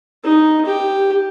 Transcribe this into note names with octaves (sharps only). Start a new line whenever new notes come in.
D#4
G4